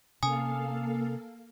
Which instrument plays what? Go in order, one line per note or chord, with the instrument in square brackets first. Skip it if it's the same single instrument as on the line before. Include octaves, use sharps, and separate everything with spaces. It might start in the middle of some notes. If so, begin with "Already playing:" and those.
[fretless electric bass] C3 C#4 [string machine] A#3 A4 F5 [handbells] G#5 D#6